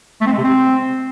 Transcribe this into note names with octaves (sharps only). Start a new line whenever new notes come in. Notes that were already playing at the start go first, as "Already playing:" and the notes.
A3
C4
G#3
C3
C4